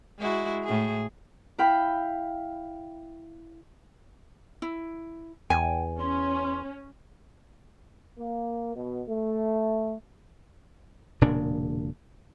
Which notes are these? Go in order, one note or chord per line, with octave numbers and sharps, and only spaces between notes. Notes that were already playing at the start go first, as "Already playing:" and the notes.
G#3 E4 F#4
A2 G#4
E4 E5 F5 G5 B5
E4
E2 G5 G#5
C#4 C6
A#3
B2
A3
E1 A#2 C#3 D4